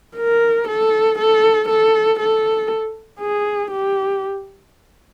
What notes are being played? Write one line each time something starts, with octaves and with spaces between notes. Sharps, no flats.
A#4
A4
A4
A4
A4
G#4
G4